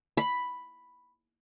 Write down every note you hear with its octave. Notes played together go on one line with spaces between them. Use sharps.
B5